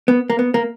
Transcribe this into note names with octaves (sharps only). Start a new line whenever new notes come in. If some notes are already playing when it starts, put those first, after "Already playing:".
B3
A#3
B3
A#3